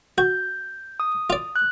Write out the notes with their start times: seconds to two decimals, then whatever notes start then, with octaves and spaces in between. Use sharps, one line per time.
0.18 F#4 G6
1.00 D#6
1.30 F4 D5
1.56 F#6